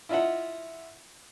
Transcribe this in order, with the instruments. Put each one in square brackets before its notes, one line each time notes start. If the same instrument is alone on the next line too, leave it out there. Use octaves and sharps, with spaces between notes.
[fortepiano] E4 F4 D#5 E5 F#5